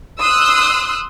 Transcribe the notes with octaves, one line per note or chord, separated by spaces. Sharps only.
C6 D#6 E6 F#6